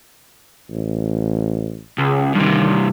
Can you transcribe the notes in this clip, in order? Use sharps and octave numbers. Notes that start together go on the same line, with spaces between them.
A1
C#2 C#3
G2 C3 D#3